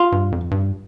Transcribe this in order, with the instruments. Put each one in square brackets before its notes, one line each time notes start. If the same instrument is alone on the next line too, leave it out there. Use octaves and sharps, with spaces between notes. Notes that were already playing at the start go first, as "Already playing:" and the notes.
Already playing: [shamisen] F4
[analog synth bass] G2
F2
G2